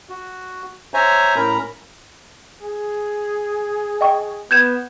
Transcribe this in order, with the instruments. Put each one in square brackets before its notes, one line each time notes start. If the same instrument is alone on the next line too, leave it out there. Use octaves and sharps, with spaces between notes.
[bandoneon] F#4
C5 C#5 E5 G#5 A#5
A2 C#4 A#4 A#5 B5
[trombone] G#4
[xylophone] D#5 G5 C#6
[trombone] B3 [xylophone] G6 G#6 E7